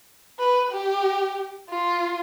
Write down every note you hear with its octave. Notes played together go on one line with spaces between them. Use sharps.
B4
G4
F4